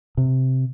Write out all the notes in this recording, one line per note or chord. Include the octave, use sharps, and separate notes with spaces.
C3